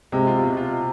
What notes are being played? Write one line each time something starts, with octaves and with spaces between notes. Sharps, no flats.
C3 G#3
F4
B2
F4
B2